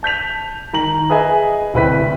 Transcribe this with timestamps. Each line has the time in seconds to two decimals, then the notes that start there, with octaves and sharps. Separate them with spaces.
0.03 A5 G6 B6 F7
0.73 D#3 A#5 F#7
1.10 G#4 B4 D#5 E5 G#5
1.74 D1 C2 E4 B4 G5 B6